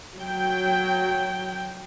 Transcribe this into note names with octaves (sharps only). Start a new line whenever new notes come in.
F#3 G5